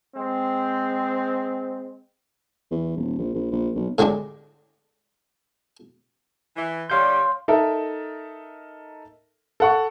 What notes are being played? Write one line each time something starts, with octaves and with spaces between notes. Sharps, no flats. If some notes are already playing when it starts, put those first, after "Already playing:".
G#3 C4
E2
D#1
A#1
A#1
A#1
B1
A2 D3 G3 G#3 D4
E3
D3 G3 C#5 F5 C6 G6
D#4 A4 A#4 E5
A4 F#5 C#6